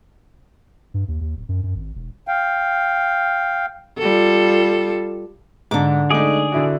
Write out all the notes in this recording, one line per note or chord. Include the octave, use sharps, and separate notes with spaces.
G2
D#2
D#2
D1
F#2
F#2
G#1
E1
F5 G5
G3 F4 A4
G#2 D3 D6
G#3 A3 D#4 G#4 D5
D3 E4 F#4